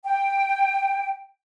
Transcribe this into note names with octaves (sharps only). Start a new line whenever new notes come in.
G5